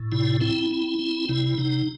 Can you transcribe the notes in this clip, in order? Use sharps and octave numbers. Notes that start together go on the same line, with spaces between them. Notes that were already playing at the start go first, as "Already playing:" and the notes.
Already playing: A2
C3 E4
C4 E4
C4
C4
C3 E4
C3 D#4